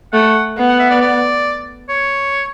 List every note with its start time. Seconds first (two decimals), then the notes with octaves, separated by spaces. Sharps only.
0.13 A3 F#5
0.58 B3
0.68 F#5
0.79 E5
0.90 D5
1.01 D5
1.89 C#5